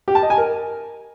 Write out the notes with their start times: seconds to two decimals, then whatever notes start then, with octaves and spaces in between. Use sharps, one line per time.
0.08 G4
0.15 A5
0.23 D#5
0.30 G#5
0.38 A#4